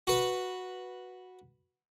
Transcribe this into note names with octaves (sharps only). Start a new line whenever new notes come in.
F#4 B4